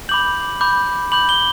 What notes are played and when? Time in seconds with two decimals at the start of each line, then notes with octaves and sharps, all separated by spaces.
0.09 B5 D6 G6 F#7
0.61 B5 D6 G6
1.12 B5 D6 G6 F#7
1.29 G7